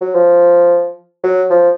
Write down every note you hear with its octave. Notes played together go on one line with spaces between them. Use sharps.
F#3
F3
F#3
F3